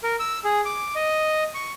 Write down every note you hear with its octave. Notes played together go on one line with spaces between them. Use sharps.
A#4
E6
G#4
D6
D#5
C#6